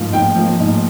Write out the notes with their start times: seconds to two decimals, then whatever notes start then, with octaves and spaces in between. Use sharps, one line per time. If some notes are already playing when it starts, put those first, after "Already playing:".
Already playing: G#2 F3 A#3
0.13 G#2 G5
0.36 F3 A#3
0.60 G#2